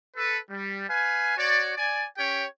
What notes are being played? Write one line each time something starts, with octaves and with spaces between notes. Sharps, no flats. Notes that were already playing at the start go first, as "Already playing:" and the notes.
A4 B4
G3
B4 F5 G#5
F#4 C#5 D5
D5 G#5
C#4 G4 C#5 G5